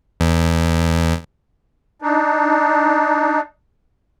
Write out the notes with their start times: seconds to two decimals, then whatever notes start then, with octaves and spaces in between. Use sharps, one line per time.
0.20 E2
2.02 D4 D#4